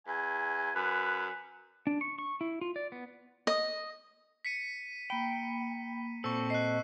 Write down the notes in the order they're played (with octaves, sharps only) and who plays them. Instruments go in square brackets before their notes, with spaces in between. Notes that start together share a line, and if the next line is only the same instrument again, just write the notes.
[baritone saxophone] E2 [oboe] G#5
[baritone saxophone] F#2 [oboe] B4
[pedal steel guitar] D4
C#6
C#6
E4
F4
D5
B3
[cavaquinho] D#5
[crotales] B6 C#7 D#7
[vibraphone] A#3 B5 [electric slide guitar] G5
[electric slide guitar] A#2 C4 A4 [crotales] C#6 E6
[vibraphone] D#5 [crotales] F#6 C7